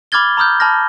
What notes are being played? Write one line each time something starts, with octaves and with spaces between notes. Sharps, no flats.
B5 D6 F6 G#6 A6 G7
A#5 B5 D#6 F6 G6
A5 B5 F6 A#6